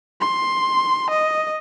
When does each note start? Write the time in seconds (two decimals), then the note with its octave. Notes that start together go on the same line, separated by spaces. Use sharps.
0.21 C6
1.10 D#5